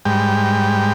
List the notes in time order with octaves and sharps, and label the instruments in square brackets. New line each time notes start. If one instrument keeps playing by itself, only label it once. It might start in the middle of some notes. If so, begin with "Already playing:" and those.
[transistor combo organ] G#2 G3 G5